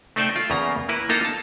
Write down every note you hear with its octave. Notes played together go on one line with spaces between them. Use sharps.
A3 D#4 C5 D5 E5 G5
F4
E2 C#3 A#3 A#5
A#3 E4 B4
A#3 D#4 F4 A4 A#5
A5